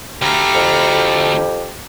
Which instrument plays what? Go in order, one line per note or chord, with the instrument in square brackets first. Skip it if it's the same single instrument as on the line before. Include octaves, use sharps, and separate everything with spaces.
[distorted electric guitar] D2 A3 [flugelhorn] G4 [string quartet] F5 A#5 B5
[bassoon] F2